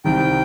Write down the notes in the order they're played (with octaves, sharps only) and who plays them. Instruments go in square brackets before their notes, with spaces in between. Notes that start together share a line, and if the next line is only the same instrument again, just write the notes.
[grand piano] C2 C3 D#3 [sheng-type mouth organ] G5